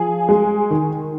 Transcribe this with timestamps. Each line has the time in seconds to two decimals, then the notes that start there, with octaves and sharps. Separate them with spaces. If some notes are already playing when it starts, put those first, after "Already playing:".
Already playing: F3 G#4
0.29 G#3
0.71 D#3